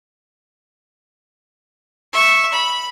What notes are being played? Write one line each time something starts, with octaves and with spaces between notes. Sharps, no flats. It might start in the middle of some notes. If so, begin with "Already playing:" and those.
E5 C#6
B5